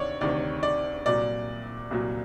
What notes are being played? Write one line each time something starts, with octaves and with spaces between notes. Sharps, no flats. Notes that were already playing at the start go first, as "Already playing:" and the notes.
Already playing: D2 C3 D#3 C#5 D5
D2 C3 D#3 D5
D5
C2 A#2 F#3 D5
C2 A#2 F#3